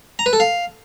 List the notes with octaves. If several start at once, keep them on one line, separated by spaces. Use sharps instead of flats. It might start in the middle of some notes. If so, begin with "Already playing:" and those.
A#5
B4
A4
F5